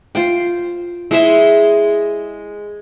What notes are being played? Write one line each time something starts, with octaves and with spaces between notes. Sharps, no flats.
F4 C5 G5
G#3 E4 C5 E5